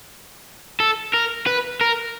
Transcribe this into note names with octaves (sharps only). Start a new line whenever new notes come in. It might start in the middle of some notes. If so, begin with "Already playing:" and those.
A4
A#4
B4
A#4